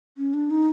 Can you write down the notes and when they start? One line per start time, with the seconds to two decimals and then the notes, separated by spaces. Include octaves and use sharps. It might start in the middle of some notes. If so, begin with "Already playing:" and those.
0.18 C#4
0.34 D4
0.51 D#4